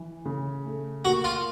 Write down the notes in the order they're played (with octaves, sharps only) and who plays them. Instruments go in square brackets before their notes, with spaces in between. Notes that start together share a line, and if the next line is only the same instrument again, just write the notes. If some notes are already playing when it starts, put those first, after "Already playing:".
Already playing: [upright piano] E3
C#3
A3
[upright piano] A#3 [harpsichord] F#4
[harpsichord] F4